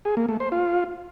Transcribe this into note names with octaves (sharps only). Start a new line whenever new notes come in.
G#4
A#3
A3
C5
F4